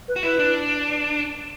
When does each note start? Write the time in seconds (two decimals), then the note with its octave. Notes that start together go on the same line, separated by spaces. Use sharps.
0.08 B4
0.16 F#4
0.23 E4 B4
0.39 D4